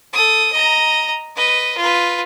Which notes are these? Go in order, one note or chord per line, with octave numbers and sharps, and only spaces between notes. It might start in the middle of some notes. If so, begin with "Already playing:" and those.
A4 D#6
D#5 A#5
B4 D#5
F4 B4